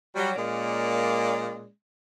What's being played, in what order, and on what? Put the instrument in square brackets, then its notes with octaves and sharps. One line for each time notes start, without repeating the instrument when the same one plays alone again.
[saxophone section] F#3 G3
A#2 G#3 A#3 C#4 D5